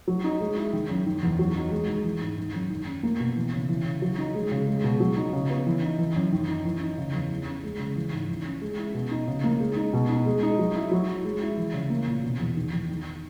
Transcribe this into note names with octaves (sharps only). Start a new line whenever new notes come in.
F#3
D#4
G#3
E4
D#3
F#2
D#3
E2
F#3
D#4
G#3
D#3
E3
G#2
D#3
F#2
D#3
C#4
A#3
B2
E3
C#3
E3
C#3
F#3
D#4
G#3
C#3
G#3
B2
F#3
D#4
C#3
B3
E3
D#4
E3
F#2
D#3
D#4
E3
D#4
C#3
E2
E3
C#4
G#3
C#3
E3
G#2
E3
C#4
G#3
E4
B2
D#4
C#3
A#3
G#3
D#4
B2
D#4
G#3
D#4
F#3
E4
F#3
E4
G#3
E4
E3
C#3
A#3
A#2
B2
E2
D#3
E2
D#3